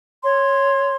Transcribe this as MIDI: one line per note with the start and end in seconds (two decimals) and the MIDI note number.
0.23 0.96 73
0.23 0.96 84